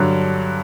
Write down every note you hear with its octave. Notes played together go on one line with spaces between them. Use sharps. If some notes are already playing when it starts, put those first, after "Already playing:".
Already playing: G2 D3 F#3